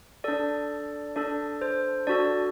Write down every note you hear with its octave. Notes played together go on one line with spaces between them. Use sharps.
D4 A4 D5
D4 A4 D5
C5
D4 F#4 A4 D5